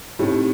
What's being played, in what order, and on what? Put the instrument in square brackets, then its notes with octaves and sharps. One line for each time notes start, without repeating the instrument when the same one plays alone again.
[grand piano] A2 [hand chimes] C4 D#4 G4